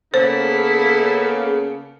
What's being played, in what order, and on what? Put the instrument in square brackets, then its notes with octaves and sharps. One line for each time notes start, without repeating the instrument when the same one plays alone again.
[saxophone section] C#3 [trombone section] A#3 B3 A4 [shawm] E4 [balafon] C5